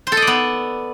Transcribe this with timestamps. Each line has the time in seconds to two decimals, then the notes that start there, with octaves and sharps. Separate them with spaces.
0.07 C5
0.12 A4
0.17 D#5
0.22 D5
0.27 B3